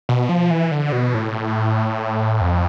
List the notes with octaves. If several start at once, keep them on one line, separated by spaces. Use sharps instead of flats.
B2
F3
E3
D3
B2
A2
F2